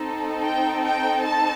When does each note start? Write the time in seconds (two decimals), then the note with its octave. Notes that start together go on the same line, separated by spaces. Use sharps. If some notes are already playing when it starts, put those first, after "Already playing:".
Already playing: C4 D#4 A4
0.43 G5
0.83 G5
1.24 A5